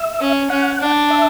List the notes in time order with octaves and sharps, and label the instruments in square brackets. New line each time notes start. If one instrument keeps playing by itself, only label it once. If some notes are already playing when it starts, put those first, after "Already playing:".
Already playing: [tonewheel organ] E5
[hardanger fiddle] C#4
[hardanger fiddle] C#4 [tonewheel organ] F#5
[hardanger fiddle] D4
[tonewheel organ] E5